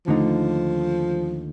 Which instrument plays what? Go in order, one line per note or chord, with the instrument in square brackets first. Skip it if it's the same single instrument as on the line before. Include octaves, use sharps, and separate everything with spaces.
[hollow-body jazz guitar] D#2 D3 A3 D#4 [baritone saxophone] F3